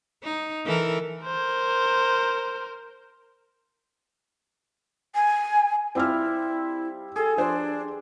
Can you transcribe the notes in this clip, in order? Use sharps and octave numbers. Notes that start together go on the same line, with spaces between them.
D#4
E3 A4 A#4
A#4 C5
G#5
G3 C4 E4 F4 E5 F6
G#4 A4
F3 D4 C5